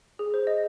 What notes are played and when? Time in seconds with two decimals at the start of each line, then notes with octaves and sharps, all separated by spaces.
0.19 G#4
0.34 C5
0.47 D#5